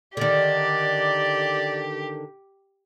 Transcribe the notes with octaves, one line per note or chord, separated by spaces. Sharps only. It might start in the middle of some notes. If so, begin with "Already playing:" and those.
D3 D#3 G4 D5